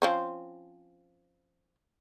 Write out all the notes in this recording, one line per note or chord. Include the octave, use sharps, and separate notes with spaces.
F3 C4 C#4